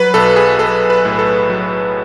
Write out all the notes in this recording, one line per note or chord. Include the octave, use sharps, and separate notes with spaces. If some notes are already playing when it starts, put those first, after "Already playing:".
Already playing: F#3 B4
B1 A4
G#4
B1 A4
B4
A2
A4
F#3